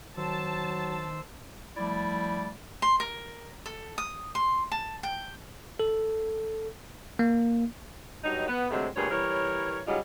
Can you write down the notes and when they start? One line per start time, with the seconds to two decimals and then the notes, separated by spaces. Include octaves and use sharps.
0.17 D#3 F#3 C5 A5 E6
1.77 F3 G3 A3 E4 D5
2.82 C6
3.00 A#4
3.66 A4
3.98 D#6
4.35 C6
4.72 A5
5.03 G5
5.80 A4
7.19 A#3
8.24 G2 F#3 D#4
8.48 B3
8.70 D2 C3 F#3 G#3 A3 C4
8.95 D2 G2 A#2 G#4 C#5
9.10 E3 G3 A#4 C#5
9.87 G#2 C#3 F#3 G3 F4 D#5